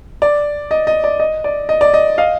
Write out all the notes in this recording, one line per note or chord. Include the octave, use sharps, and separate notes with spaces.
D5
D#5
D#5
D5
D#5
D5
D#5
D5
D#5
D#5 F5